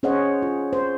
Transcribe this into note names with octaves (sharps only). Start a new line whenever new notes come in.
C#4 G#4 C5 C#5 D#5 F#5
F4
C5